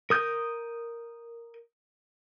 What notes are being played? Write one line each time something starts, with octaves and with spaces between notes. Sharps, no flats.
A#4 D#6 G6